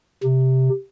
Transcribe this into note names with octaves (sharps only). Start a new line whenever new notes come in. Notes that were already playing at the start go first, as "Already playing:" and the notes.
C3